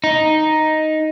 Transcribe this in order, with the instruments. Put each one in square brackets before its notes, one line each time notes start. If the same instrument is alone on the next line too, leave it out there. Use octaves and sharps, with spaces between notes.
[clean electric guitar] D#4